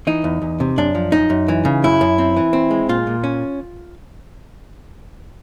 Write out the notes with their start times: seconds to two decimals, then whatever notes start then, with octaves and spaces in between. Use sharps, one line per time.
0.07 E3 D#4
0.24 E2
0.42 E2
0.60 C3
0.78 F#2 D4
0.95 F3
1.12 F#2 D#4
1.30 F#2
1.48 E3
1.65 C#3
1.84 F#2 E4
2.01 F#2
2.18 C4
2.37 E3
2.53 C4
2.71 G#3
2.89 A#2 F4
3.07 A#2
3.24 C#4